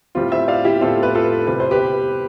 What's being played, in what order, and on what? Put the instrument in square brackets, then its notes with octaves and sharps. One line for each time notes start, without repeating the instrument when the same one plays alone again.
[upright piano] A2 G3 C4 F4
C5 E5
D5 F5
E4 G4
A2 G3 C4 F4 A4
B4
F4 A4
C3 G3 C4 B4
C5
G4 B4